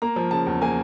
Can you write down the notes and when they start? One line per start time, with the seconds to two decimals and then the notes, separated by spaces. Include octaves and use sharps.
0.02 A#3 A#5
0.16 F3
0.31 C#3 A5
0.46 E2
0.61 A#3 G#5